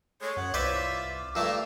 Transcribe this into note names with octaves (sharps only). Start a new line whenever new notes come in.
G#3 A3 C#5
F#2 F#5
C2 F4 B4 C5 D5 E5
D6
G2 A3 A#3 F4 F5 E6